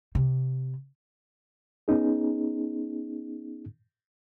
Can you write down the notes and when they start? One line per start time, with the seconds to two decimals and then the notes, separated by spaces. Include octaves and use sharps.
0.15 C3
1.88 B3 C#4 D#4 G#4